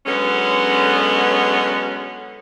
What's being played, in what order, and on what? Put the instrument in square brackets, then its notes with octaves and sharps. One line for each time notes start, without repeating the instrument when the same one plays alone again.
[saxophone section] D3 F#3 G#3 B3 C#4